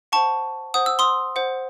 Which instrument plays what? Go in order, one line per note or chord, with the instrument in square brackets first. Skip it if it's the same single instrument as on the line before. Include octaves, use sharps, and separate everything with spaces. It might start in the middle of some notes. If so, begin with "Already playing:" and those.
[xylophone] C5 F#5 A5 C#6
C5 F#5 D#6
E6
C6 D#6
C5 F#5